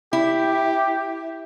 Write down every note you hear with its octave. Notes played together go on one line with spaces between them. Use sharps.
E4 G4